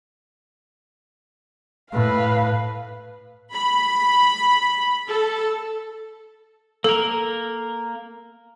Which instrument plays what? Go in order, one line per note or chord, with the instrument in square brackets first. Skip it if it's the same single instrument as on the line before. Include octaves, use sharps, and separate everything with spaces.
[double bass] A2 [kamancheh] B4 F5
[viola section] B5
A4
[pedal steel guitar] A#3 A#4 [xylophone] A4